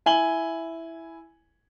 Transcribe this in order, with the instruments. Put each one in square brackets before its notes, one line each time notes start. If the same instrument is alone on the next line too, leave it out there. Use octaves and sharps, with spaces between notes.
[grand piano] E4 G#5 F#7 G7